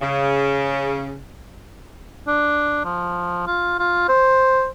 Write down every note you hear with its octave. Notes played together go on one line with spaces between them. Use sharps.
C#3
D4
F3
F4
F4
C5